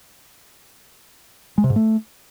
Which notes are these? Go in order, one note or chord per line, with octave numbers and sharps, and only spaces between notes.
G#3
C3
G#2
A3